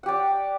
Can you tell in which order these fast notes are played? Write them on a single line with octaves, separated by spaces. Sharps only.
F#5 G4 D5